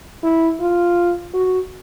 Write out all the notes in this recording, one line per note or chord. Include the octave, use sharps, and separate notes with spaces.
E4
F4
F#4